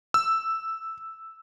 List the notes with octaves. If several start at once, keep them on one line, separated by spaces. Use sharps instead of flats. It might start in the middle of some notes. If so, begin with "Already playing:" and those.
E6